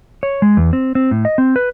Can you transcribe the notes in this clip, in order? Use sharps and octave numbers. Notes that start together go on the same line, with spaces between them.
C#5
G#3
E2
C4
C4
A2
D#5
C4
B4